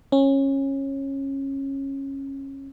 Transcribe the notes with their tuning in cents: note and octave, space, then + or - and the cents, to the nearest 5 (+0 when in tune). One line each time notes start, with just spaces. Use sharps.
C#4 -20